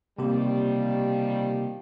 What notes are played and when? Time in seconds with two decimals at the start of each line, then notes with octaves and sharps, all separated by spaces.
0.18 C3 D#3 F3 G3 A#3 G4